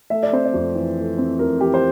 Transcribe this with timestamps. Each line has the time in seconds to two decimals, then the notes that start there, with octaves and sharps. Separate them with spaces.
0.10 A3 E5
0.23 D5
0.33 C4 C5
0.45 D5
0.54 F2
0.75 E3
0.97 A3
1.18 C4
1.39 F2 A#4
1.61 E3 G4
1.74 C5